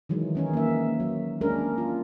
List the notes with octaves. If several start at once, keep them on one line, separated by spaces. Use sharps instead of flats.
D#3 E3 F#3 G#3
D#3 C#4 D#4
A#3 E5
F#3
G#3 A#3 C#4 D4 A#4
F4